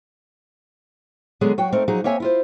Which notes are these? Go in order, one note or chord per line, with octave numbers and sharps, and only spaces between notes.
D3 F#3 G#3 B3 G#4
F#3 F#4 G5
A3 C4 D#4 A#4
F3 F#3 D#4 G#4
A#3 C4 C#5 E5 G#5
E4 F4 C5